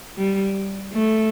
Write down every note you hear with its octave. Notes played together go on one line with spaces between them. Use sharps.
G3
A3